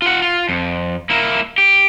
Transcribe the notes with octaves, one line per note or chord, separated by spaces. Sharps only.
F4 F#5
F4
F2
A#3 E4
G4